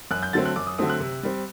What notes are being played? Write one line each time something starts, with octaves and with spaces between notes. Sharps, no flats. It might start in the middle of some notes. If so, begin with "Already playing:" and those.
F#2 F#6
G6
D3 F#3 A3 C4 A6
F#6
F#2 D6
D#6
D3 F#3 A3 C4 D#6
F#6
C3
G3 C4